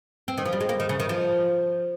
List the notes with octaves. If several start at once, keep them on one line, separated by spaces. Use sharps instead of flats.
C4
D#3
F3
G3
G#3
A#3
D#3
C#3
D#3
F3